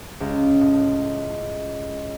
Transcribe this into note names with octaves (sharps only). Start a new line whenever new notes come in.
C#2
A2